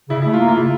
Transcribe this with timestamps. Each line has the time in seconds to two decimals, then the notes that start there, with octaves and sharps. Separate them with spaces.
0.09 C#3 E4
0.22 A3 E4
0.33 F4
0.40 A#3
0.48 F4
0.55 C#3 E4